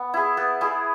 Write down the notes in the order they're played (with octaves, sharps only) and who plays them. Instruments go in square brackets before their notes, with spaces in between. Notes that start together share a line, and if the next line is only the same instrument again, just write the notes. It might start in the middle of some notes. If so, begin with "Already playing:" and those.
Already playing: [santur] B3
E4 G#4
B3
E4 G#4